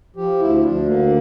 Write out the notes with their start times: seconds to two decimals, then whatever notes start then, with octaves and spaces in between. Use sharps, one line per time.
0.16 F3 G4
0.39 D2 E4
0.63 D2 D4
0.86 D3 A#3